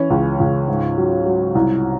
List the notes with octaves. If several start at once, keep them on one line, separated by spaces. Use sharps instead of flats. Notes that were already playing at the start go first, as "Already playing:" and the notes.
Already playing: E3 C#4
C#2
C#2
G#2
F#3
F#3
C2